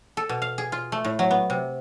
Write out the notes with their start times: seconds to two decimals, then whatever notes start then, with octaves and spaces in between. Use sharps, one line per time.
0.17 A4
0.29 B2
0.42 F5
0.58 G#4
0.72 F4
0.92 A3
1.05 A2
1.19 F#3
1.31 B3
1.50 C3